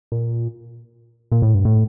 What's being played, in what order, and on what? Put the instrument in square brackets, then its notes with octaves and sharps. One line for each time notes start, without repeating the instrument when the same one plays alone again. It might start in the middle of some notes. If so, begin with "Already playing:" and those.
[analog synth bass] A#2
A#2
A2
G2
A2